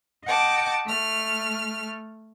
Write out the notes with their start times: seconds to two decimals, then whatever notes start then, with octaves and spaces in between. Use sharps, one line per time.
0.24 D#5 F#5 G5 A5 D6
0.87 A3 F6